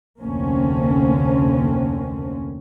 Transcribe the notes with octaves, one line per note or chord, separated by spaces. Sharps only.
F1 D2 D3 A#3 C4 C#4